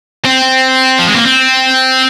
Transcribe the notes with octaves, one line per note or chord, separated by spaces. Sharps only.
C4
F3
G#3
A#3
C4